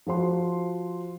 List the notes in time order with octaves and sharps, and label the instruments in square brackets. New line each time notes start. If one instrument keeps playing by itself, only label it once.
[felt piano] F3 F#4 C5 C6